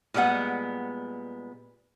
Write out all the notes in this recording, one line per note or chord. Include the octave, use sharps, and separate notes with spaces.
A#2 G3 G#3 B3 F#5